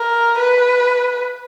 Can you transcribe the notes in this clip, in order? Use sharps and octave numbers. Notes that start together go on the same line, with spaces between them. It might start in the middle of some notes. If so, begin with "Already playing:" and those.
Already playing: A#4
B4